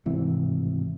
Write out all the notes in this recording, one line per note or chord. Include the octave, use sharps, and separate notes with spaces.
D1 G#1 C3 E3